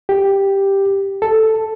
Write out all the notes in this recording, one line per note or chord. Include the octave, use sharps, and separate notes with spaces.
G4
A4